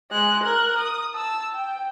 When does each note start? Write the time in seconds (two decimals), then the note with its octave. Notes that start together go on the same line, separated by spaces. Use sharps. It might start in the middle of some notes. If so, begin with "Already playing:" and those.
0.11 G#3 F#6
0.43 A#4 F#6
0.78 D#6
1.14 A5 E6
1.55 G5